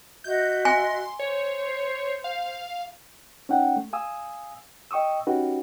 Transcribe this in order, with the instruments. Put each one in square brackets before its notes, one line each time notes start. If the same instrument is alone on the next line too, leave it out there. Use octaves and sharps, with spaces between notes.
[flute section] F#4 D#5 E5 [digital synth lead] G6
[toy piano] G#5 [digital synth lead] C6
[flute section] C5 [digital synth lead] C#5
[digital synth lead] F5
[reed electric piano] C#4 D#4 F#5 G5
A3
F5 G#5 D#6 E6
D#5 G5 C#6 D#6 E6
C#4 D#4 F#4 G4 B4